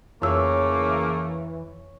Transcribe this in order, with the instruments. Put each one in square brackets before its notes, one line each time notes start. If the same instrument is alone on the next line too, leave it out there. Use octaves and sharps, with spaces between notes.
[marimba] F2 E6 [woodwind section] C#3 A3 A#3 [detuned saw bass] E3 [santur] C#5